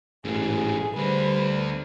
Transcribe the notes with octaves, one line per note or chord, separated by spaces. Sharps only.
A1 G#2 G3 G#4
D2 D3 G3 B4 C5